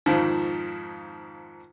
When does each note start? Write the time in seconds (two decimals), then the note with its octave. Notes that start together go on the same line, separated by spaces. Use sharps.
0.06 F2 G#2 D#3 F3